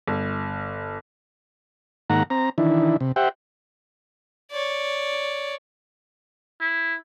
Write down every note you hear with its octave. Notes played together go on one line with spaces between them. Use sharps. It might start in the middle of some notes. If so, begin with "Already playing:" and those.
G1
G#2 D#3 A#3 F#5 A#5
C4 A#5
D#3 E3 D4 E4
C3
G4 C5 E5 F#5 G5
C#5 D5
E4